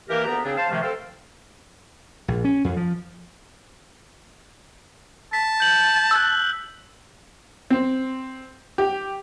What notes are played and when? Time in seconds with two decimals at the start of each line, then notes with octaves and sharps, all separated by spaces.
0.09 E3 A#3 G4 A#4
0.25 D2 B3 G4 D5 A#5
0.44 C#3 C4 D4 G#4
0.57 C5 F5 A5
0.70 C3 D#3 F3 A3
0.81 C4 A4 A#4 C5 F5
2.28 A#1
2.44 C#4
2.64 F2
2.77 F3
5.33 A5 B6
5.60 G6 F#7
6.11 E6 F#6
7.70 C4
8.78 G4